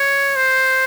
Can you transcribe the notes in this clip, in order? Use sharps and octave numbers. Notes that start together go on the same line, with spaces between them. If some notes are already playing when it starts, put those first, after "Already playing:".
Already playing: C#5
C5